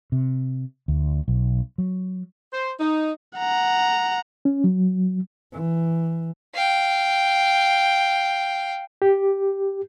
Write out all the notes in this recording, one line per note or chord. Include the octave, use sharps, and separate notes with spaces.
C3
D2
B1
F#3
C5
D#4
F#5 A#5
C#4
F#3
E3
F5 G5
G4